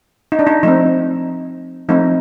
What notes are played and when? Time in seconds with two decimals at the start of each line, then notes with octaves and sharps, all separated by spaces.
0.32 D#4
0.39 D4
0.47 D#4
0.63 F3 A3 C4 D#4
1.89 F3 A3 C4 D#4